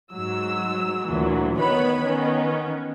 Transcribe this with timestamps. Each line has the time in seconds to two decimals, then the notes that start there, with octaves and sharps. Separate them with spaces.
0.12 G#2 F#3 E6
1.08 D2 A#2 E3 F#3
1.58 D#3 B3 B4 C#5 B5
2.05 D#3 B3 C#4